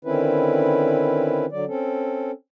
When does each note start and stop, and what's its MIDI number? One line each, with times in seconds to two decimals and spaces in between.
0.05 1.46 50
0.05 1.46 51
0.05 1.46 60
0.05 1.46 61
0.05 1.46 64
0.05 1.46 71
1.52 1.65 50
1.52 1.65 54
1.52 1.65 74
1.68 2.31 60
1.68 2.31 61
1.68 2.31 69